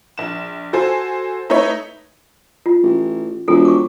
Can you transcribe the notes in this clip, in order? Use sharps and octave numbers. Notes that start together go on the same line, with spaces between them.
A#1 E7
F#4 A4 C5 G#5
A3 D#4 E4 B4 C#5
F4
A1
E1 F4 A4
C#6 D6